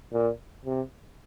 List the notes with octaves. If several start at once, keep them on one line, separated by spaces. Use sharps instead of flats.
A#2
C3